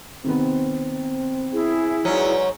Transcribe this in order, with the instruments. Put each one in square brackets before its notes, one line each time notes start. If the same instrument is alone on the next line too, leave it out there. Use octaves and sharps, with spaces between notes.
[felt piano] C3 D#3 B3 [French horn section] C4
[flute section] E4 G#4
[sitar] G#2 F#3 C#4 [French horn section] F#4 B4 D5